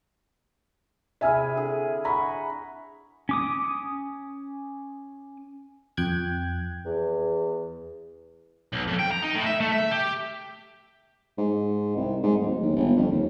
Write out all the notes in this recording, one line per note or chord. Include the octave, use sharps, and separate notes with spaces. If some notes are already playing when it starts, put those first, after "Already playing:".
C3 E4 G#4 E5 G#5 F6
D3 G#4
F#5 A#5 B5 C#6
C#4 D6 D#6
F2 G5 F#6 G#6
E2
B1
F2
G5
A#5
D#4
A2
E5
A3
E5
G4
G#2
C2
G#2
D1
D#2
G1
F2
D#2